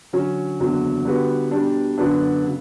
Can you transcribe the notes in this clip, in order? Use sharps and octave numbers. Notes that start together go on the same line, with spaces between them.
D3 F#3 C#4
F#1 E2 D3 F#3
D3 G3 B3 F#4 B4
B2 G3 D4
F#2 D3 F#3 B3 D4
C#3